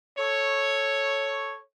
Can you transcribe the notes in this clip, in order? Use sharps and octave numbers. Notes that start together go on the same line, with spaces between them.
A4 C#5